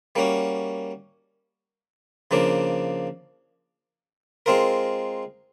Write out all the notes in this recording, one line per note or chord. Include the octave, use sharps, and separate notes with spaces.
G3 A#3 C#4 F#4
C#3 F3 A#3 D4
G#3 C4 F4 A#4